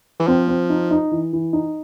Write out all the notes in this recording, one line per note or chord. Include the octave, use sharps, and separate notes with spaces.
E3
F3 C4
C4
D#4
D#4
E3
E3
D#4